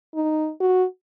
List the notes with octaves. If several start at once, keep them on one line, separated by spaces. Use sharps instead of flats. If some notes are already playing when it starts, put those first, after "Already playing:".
D#4
F#4